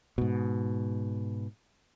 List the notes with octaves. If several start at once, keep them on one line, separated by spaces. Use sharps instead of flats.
G#2 B2